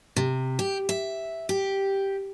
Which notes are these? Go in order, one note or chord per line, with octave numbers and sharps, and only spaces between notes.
C3
G4
E5
G4